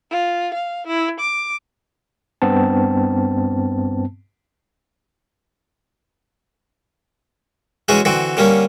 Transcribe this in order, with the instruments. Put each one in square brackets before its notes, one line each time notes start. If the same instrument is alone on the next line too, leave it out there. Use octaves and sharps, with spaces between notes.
[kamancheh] F4
F5
E4
D6
[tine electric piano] G2 B3 C4 A5
[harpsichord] E3 G#3 C#4 F#4 G#4
D3 E3 C4 F#4
D3 G3 A#3 C#4